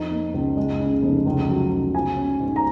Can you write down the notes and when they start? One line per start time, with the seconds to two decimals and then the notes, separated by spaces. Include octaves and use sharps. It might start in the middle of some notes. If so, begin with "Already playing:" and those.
Already playing: F2 D#4
0.11 A#3
0.34 C#2
0.57 G#3
0.80 C#3
1.03 F1
1.26 C#2
1.49 F#3
1.71 C#2
1.94 F4 G#5
2.17 C#4
2.40 G#2
2.56 A#5